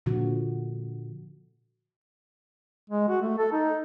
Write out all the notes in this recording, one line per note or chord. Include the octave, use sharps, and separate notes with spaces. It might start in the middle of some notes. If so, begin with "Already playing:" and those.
A#2 D3 F3 F#4
G#3
F#4
A3
A4
D#4